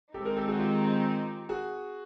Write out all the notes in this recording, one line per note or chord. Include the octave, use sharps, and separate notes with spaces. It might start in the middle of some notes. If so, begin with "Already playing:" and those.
D#3 G#3 C4 D#4 G4 A4
G#4 A#4
G4 A4
F#4 G#4
F4 G4
F#4 G#4